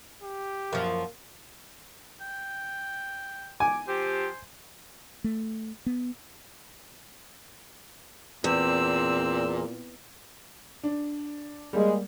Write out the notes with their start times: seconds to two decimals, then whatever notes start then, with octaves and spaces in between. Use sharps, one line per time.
0.22 G4
0.73 F#2 F3 A#3
2.21 G5
3.60 G#5 D6
3.87 F3 C4 G4 C5
5.24 A3
5.86 B3
8.44 E2 A#2 C4 E6
10.83 D4
11.73 G3 G#3 A#3